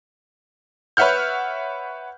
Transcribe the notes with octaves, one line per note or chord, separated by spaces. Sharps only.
B4 C#5 E5 F#5 F6 G6